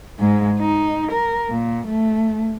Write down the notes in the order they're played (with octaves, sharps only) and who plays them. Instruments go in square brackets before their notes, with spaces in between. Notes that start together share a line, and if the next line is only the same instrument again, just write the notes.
[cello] G#2 G#3
D#4
A#4
A#2
A3